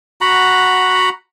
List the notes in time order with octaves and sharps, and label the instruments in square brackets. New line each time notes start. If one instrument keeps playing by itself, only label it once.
[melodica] F#4 F#5 A#5 B5